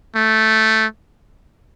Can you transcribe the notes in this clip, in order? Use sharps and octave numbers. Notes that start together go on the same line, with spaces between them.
A3